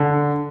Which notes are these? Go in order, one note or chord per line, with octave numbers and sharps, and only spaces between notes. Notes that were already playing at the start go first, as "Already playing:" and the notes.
Already playing: D3